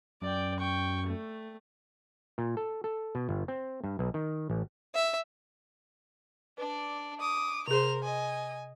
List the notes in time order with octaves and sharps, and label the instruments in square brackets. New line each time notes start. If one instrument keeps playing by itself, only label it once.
[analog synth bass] F#2 [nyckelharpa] D5 G5
[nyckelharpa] G5 C#6
A3
[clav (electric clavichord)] A#2
A4
A4
B2
G1
C4
G2
B1
D#3
A1
[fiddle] E5
[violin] D4 D5 [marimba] B4
[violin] D6 [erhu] D#6
[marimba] C3 G#4 [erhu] A#4 [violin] C5 F7
[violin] D#5 [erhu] G#5